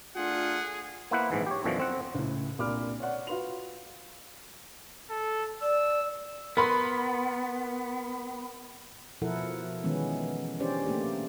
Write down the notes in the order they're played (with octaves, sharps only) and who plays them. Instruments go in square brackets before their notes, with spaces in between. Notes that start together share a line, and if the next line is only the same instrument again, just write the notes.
[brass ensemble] A3 D4 F4 [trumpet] G#4 [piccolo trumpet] F#5
[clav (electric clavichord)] A#3 B3 E4 B4 C5 F#5
A#1 G#2 E3
G4 C#5
F#2 B2 D3 E3 F3
C4 F#5
[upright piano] C#2 A2
C2 A#2 D4 B5 D6 F6
C#5 D5 F#5
F4 F#4 B4 C6 F7
[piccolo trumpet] A4
[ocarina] D5 [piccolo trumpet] E6
[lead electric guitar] B3 [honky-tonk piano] A#4 B5 C6
[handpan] B2 F3 E4 A4 A#4 F#5
D#3 E3 G#3 B3 C#4
C#4 D4 G4 C5 D5
A3 A#3 G4